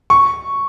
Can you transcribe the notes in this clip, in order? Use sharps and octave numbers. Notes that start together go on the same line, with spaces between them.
C#6